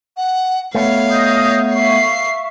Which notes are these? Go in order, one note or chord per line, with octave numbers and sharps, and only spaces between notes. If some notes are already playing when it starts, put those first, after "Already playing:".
F#5
A3 B3 C#5 F5
D#5 D#6 G6
E5 F5 C#6 C7